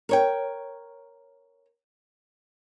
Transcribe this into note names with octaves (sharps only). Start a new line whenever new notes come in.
A#4 C#5 G5